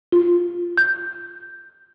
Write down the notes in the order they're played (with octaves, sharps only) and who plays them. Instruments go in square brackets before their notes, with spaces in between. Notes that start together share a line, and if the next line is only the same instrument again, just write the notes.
[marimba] F4
G6